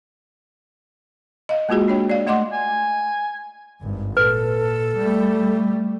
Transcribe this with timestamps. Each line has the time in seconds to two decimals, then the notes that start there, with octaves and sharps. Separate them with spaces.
1.49 D#5 F5
1.69 G#3 A#3 F4 F#4 G#4
1.88 D4 C#5 G5
2.10 D5 F5
2.27 A3 D#5 F#5 C6 D6
2.53 G#5
3.82 G#1 G2
4.17 A#2 A4 B4
4.97 G3 A3